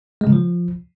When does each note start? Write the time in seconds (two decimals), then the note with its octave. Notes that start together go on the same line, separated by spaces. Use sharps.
0.21 G#3
0.27 C#3
0.33 F3